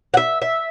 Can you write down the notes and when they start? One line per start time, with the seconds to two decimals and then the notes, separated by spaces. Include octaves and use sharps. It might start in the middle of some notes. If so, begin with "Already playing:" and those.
0.14 F#5
0.17 E5
0.42 E5